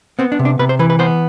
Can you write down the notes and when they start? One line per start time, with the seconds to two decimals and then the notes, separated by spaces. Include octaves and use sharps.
0.19 B3 C4
0.32 D4
0.39 C3
0.45 D4
0.59 C3 B4
0.69 C5
0.79 E3 B4
0.90 B4
0.99 B3 C5